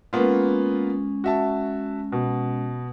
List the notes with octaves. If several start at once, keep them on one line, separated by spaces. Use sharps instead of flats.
G#3 A#3 B3 C#4 F4
F#4 E5 A5
B2